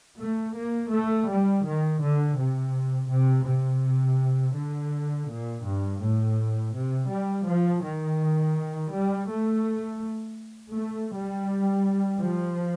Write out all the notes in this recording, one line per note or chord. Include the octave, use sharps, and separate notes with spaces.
A3
A#3
A3
G3
D#3
D3
C3
C3
C3
D3
A#2
G2
A2
C3
G3
F3
D#3
G3
A3
A3
G3
F3